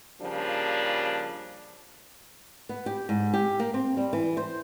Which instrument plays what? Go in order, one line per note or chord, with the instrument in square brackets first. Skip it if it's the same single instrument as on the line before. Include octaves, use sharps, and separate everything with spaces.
[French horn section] C#3 F3 G3 A#3 D4
[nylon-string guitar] B3
G4
G#2
G4
A#3
C4
G3
E3
C5